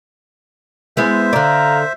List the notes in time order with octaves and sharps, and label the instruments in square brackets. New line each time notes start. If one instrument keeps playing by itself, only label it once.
[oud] G#3 B3 E4 [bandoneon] C5 E5
[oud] D3 D5 [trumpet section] F5 A#5